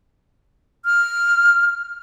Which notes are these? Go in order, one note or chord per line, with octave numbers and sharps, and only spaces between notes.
F6